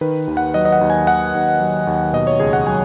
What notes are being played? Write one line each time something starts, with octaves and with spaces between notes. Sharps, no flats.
D#3 B4
D#2
F#5
F#3 D#5
D#5
F#5
D#2
G#5
D#3 F#5
D#2
F#3
D#2
B2 D#5
C#5
C#2 G#4
F#5
F#3 G#5